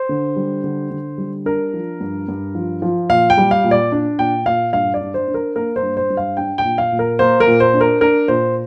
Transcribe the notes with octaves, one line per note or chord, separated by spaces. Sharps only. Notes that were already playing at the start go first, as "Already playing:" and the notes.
Already playing: C5
D3
G3
D3
D3
G3
D4 A#4
F3
G2
G2
F3
F3
A#2 F5
G5
G3
F5
A#2
D5
D4
A#2 G5
A#2 F5
G2 F5
D5
D4
C5
D4
A#4
A#3 A#4
C5
G2
C5
G2
F5
D4 G5
G5
A#2
F5
A#2
A#4
A#3 C5
A#4
A#2
C5
D4
A#4
D4 A#4
A#2 C5